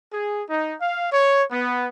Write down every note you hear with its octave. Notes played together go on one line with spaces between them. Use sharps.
G#4
D#4
F5
C#5
B3